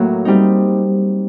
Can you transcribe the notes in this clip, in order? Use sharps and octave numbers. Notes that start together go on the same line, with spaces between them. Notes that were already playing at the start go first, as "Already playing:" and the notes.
Already playing: A2 F#3 A#3 F#4
G3 C4 D#4